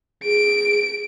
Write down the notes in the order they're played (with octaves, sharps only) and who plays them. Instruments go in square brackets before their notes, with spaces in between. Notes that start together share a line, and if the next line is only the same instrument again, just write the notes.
[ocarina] G#4 [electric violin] D7